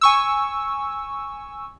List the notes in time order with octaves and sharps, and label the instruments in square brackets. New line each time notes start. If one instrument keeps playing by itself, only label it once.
[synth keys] G#5 C#6 E6